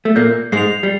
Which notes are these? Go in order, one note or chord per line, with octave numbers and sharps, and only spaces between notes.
A3
A#2 A#3 G6
G#2 G#3 C7 F7
G3